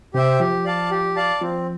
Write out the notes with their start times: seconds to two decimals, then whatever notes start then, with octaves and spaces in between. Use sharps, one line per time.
0.14 C3 G4 C5 E5 G5
0.40 F3 G4
0.65 D5 F5 A5
0.91 G4
1.16 D5 F5 A5
1.41 F3 C4